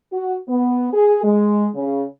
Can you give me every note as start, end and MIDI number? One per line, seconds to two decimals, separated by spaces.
0.13 0.36 66
0.49 0.89 59
0.93 1.20 68
1.24 1.68 56
1.75 2.05 49